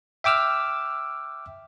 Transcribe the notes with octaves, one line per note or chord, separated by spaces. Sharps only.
E5 G5 D6 E6 F6